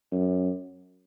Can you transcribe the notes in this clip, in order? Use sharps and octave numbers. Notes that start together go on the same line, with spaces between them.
F#2